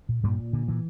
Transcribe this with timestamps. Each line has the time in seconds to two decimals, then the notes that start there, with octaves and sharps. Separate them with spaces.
0.09 A#2
0.23 G2 A#2 G3
0.38 A#2
0.53 A#2 D3
0.68 A#2 E3